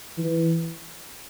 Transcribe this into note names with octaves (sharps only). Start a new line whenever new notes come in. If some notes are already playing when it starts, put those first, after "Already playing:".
E3